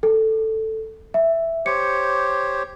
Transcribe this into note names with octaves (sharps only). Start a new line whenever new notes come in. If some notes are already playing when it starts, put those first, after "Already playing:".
A4
E5
G4 C5 C#5 C#7